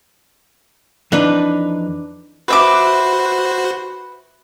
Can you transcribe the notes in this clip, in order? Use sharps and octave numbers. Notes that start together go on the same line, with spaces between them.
F2 E3 D4 D#4 B4
F#4 B4 C5 E5 D6